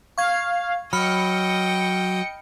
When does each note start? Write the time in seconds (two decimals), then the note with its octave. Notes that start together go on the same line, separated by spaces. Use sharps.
0.18 F5 C#6 G#6
0.93 F#3 D#5 G5 B5 F6 C#7